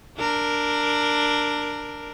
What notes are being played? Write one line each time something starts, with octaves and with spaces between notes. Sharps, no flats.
D4 A#4